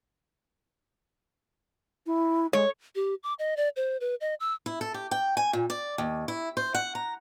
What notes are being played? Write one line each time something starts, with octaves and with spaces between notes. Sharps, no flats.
E4
G#3 C#5
G4
D6
D#5
D5
C5
B4
D#5
E6
E4
A4
G4
G5
G#5
A#2
D5
D#2
E4
C5
F#5
A#5